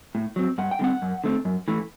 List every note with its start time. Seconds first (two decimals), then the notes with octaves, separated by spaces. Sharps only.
0.15 A2
0.36 F#3 C4
0.58 G2 F#5
0.71 G5
0.79 D3 G3 C4 F#5
1.02 F#2
1.24 D3 A3 C4
1.45 F#2
1.68 E3 A3